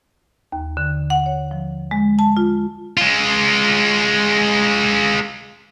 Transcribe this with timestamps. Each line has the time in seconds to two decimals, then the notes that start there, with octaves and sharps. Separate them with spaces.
0.52 D#2
0.77 D3
1.10 F#5
1.26 C#5
1.51 F3
1.91 G#3
2.19 A5
2.37 F4
2.97 G#3 F4